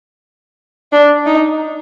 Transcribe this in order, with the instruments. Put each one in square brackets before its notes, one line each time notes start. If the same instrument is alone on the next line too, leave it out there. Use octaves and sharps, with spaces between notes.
[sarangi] D4
D#4